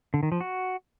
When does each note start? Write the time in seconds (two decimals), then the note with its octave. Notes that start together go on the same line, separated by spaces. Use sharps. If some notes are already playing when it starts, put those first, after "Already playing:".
0.14 D3
0.23 D#3
0.32 F3
0.41 F#4